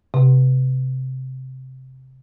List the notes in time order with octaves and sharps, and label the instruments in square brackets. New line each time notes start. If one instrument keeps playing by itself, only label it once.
[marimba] C3